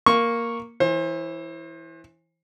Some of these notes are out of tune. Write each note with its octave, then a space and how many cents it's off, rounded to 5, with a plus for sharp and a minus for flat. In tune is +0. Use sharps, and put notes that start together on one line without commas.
A#3 +0 C#6 -5
E3 +0 C5 +35